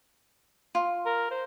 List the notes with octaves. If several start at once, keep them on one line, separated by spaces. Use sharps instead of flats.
F4
A#4
C5